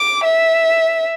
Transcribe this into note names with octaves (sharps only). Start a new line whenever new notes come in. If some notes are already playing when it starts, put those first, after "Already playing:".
Already playing: D6
E5